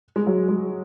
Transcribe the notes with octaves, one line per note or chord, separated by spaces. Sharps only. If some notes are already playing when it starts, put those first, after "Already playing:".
G#3
F#3
G#3